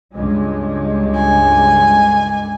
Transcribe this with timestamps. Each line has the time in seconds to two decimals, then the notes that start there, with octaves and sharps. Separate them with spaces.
0.14 C#2 G2 G#3
1.15 G#5